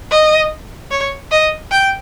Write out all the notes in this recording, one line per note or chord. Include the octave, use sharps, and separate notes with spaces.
D#5
C#5
D#5
G5